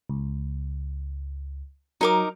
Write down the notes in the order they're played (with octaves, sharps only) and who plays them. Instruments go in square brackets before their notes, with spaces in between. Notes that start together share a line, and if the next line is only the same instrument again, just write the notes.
[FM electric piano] C#2
[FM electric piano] F#3 [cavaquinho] D#4 A#4 D6